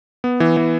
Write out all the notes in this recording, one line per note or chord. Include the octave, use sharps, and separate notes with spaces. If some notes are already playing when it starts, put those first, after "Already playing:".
B3
E3
E3